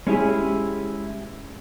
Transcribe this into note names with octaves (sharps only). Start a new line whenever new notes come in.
G#3 C#4 E4 G4 G#4